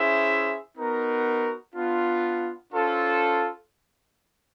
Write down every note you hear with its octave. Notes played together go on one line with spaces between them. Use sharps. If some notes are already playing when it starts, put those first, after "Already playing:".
Already playing: C#4 E4 G#4 C5 E5
B3 D#4 F#4 A#4
B3 D4 F4
C#4 F4 A4 C5